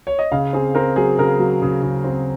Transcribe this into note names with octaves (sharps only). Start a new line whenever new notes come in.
C#5
D#5
C#3 F5
C4 G#4
C4 A#4
F#3 G#4
C#3 A#4
F#3
C#3
C#3
C4